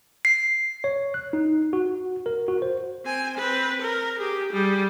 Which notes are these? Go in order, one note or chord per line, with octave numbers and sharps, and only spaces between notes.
C7
C#5
F#6
D#4
F#4
A#4
F#4
C5
C4 G#5
C4 B4
A#4
G4 G#4
G3 G#4